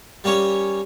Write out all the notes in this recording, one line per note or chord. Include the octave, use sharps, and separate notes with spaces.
G3 A#3 C#4 C#5